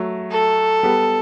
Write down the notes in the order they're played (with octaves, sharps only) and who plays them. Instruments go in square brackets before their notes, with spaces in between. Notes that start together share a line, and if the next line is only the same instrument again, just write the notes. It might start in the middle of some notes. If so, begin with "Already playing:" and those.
Already playing: [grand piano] F#3 A3
[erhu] A4
[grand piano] G3 B3